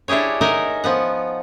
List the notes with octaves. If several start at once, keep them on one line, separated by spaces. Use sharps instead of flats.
D4 E4 G4 G#4 C#5
D#4 A#4 E5 F#5 G#5
F3 B3 F#5